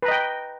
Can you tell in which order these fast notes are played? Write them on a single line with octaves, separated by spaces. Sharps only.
B4 A#5 D#5 G5